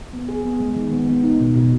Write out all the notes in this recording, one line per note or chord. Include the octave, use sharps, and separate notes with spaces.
B3
G#4
B3
G#3
D#3
B3
B3
D#4
B2
B2